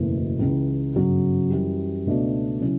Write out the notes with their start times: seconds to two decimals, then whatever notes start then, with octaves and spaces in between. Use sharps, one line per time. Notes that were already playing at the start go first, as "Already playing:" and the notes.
Already playing: F#1 E2 B2 A3 E4
0.39 C#2 C#3 E3
0.94 G1 F#2 C#3 F#3
1.50 F#2 E3 G3
2.06 C#2 B2 A3 D4 F#4
2.61 C#3 F#3 C#4 E4